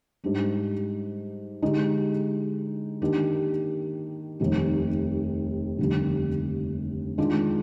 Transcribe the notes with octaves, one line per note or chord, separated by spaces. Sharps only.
G#2 G3 D4
D3 G#3 D#4 G4
D#3 A#3 D4 G4
F1 D#2 D#3 G3
F1 D#2 D3 G3 A#3
D#3 G#3 D4 F4